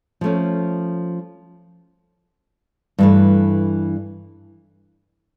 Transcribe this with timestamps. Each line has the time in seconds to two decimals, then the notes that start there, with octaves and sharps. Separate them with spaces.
0.21 F3 A3 C#4
2.99 G2 E3 A3